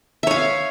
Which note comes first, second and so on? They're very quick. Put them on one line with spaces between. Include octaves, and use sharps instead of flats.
E5 C#5 F5